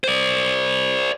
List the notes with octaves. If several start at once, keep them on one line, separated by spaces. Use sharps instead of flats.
C5 D5